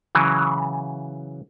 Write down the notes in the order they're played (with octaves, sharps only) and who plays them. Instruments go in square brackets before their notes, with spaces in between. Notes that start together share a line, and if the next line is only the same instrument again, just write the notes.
[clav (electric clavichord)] C#3 E3 F#3